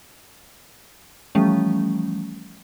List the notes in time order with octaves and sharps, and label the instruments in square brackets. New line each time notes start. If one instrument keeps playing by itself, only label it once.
[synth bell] E3 F3 G3 A3 C#4